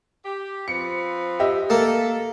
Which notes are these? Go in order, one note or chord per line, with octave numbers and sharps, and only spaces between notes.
G4
F3 C4 B4 C#7
G4 D#5 E5
A#3 A4